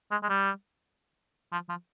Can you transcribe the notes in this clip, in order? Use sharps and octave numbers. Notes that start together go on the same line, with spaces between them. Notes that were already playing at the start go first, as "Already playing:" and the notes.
G#3
G#3
G3
F3
F3